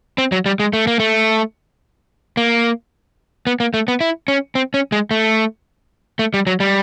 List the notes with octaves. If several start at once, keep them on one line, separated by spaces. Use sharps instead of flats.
C4
F#3
G3
G#3
A3
A#3
A3
A#3
B3
A#3
A3
B3
E4
C#4
C4
C#4
G#3
A3
A3
G3
F#3
G3